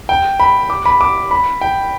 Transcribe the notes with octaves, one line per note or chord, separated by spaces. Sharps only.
G5
B5
D6
B5
D6
B5
G5